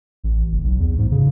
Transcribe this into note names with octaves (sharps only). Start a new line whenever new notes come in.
A1
F#1
B1
E2
G#2
C#3